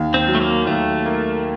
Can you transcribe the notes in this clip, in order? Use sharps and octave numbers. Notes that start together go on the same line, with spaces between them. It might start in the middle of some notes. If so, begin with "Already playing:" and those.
Already playing: D#2
C4
F#3
A3
A#3
D#2 A3
A#3